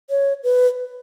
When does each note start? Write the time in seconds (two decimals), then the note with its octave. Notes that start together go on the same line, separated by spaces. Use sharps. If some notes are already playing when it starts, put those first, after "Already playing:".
0.10 C#5
0.43 B4